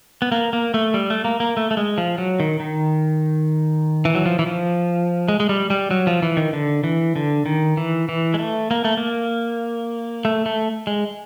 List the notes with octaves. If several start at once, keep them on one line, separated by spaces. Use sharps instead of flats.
B3
A#3
A#3
A3
G3
A3
A#3
A#3
A3
A3
G#3
F3
F#3
D#3
D#3
E3
F#3
F3
E3
F3
G#3
G#3
G3
G3
F#3
F3
E3
D#3
D3
E3
D3
D#3
E3
E3
G#3
A3
A#3
A3
A#3
A3
A3
G#3